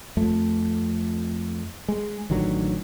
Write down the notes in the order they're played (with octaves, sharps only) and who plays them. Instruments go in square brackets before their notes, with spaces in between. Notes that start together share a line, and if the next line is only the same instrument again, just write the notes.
[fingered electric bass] F2 A3
G#3
A1 D3 D#3 F#3